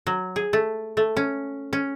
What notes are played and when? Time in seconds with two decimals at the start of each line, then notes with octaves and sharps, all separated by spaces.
0.07 F#3
0.36 G#4
0.53 A3
0.97 A3
1.17 C#4
1.73 C#4